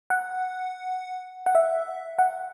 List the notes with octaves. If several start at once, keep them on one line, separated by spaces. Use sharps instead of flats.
F#5
F#5
E5
F#5